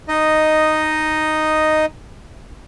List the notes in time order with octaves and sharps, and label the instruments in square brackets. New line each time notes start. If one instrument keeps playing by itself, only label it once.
[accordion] D#4 D#5